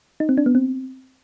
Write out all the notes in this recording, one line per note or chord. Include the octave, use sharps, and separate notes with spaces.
D#4
C4
D4
B3
C4